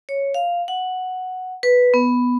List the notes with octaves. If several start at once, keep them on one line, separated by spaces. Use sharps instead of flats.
C#5
F5
F#5
B4
B3